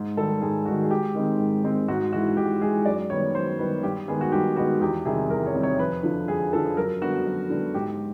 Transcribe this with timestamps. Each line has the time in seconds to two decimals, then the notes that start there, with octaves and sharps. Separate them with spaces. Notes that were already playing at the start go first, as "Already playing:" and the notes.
Already playing: G#2
0.17 D#3 G3 A4
0.42 G#2 G#4
0.66 G3 F#4
0.69 D#3
0.83 G#4
0.91 G#2 G4
1.15 D#3 G#3 C4
1.39 G#2
1.64 D#3 G#3 C4
1.88 G#2 F#4
2.13 E3 G#3 F#4
2.37 G#2 G4
2.61 E3 G#3 G#4
2.85 F#2 D5
3.10 D#3 G3 B3 C#5
3.35 F#2 C5
3.59 D#3 G3 B3 B4
3.83 G2 G4
4.08 D#3 G#3 B3 G#4
4.21 F#4
4.32 G2 G4
4.56 D#3 G#3 B3 F#4
4.81 E2 G4
5.05 C3 D#3 G3 C4 G#4
5.30 E2 A#4
5.46 C#5
5.55 C3 D#3 G3 C4
5.63 C#5
5.78 F2 B4
6.03 D3 F3
6.28 F2 G#4
6.52 D3 F3 A4
6.77 F#2 A#4
7.01 D3 G3 B3 F#4
7.26 F#2
7.50 D3 G3 B3
7.74 G#2 G4